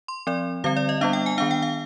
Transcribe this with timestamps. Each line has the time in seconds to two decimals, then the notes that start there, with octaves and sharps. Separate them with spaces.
0.08 C6
0.27 F3 C4 D5
0.64 D3 G3 C4 F5
0.77 D5
0.89 D#5
1.01 G3 B3 D4 F5
1.13 G5
1.26 G#5
1.38 D#3 B3 D4 F5
1.51 G5
1.62 F5